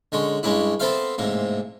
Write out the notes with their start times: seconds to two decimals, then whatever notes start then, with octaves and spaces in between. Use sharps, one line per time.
0.12 D3 G#3 C#4
0.43 G2 G#3 C#4 D4 E4
0.80 B3 C4 A4 C5 E5 F5
1.18 A1 G#2 C3 A#3